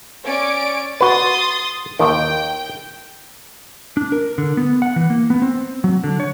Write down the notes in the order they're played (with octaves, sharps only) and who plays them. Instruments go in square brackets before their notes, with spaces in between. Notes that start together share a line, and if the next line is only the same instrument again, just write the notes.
[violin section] C#4 D5 D7
[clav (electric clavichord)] F#4 B4 [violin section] C6 D#6 A6
[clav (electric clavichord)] D#2 D#3 [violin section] G5
[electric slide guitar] D4
A#4
D3
B3
F#5
E3
A#3
B3
C4
F#3
D3
C#5